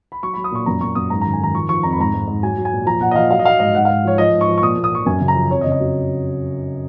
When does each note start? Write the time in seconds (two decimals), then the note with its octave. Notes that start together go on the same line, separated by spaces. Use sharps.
0.12 B5
0.23 F#3 C#6
0.34 B5
0.37 F#3
0.44 D#6
0.51 A#2 C#6
0.66 F#2 A#5
0.81 F#2 C#6
0.95 F#2 D#6
1.10 G#2 A#5
1.21 A#5
1.25 D#3
1.33 G#5
1.40 D#3 A#5
1.54 F3 C#6
1.69 F3 C#6
1.83 F2 A#5
1.92 B5
1.98 G#2 A#5
2.14 G#2
2.27 G#2
2.43 F#3 G#5
2.58 F#3
2.65 G#5
2.72 A#2
2.86 F3 A#5
3.01 A#2 F#5
3.11 D#5
3.16 F3 F5
3.30 F#3 F5
3.39 D#5
3.45 F#3 F5
3.60 G#2 D#5
3.74 G#2 F#5
3.85 F5
3.89 G#2
4.04 F3 C#5
4.18 F3 D#5
4.33 G#2
4.41 C#6
4.48 F3
4.58 C#6
4.62 A#2 D#6
4.77 A#2
4.84 D#6
4.92 F3 C#6
5.06 F#2 G#5
5.21 C#3
5.28 A#5
5.35 F3
5.51 F2 C#5
5.61 D#5
5.66 C#3
5.72 D#5
5.80 F#3